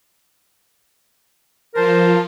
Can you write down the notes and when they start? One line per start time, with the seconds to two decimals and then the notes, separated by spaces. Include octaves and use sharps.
1.75 F3 F4 A#4 C5 A5